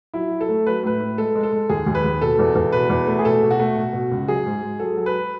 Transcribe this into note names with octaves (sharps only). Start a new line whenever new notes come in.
F#3 E4
F#3
A4
A3
F#3 B4
A2 B4
A2
G#3 A4
G#3
A4
G#3
D#2 G#4
D#2
B4
D#2
B2 A4
E2
E2
B2 B4
E2
A3
G#4
B2 A4
B2
F#4
A3
B2
B2
C#2
F#3 G#4
G#2
G#2
F#3 A4
F#3
B4